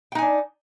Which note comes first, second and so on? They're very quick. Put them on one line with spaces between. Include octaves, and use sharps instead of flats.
G5 D#4 G#5 D4